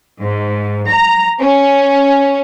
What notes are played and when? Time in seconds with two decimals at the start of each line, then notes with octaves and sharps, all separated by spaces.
0.21 G#2
0.89 A#5
1.40 C#4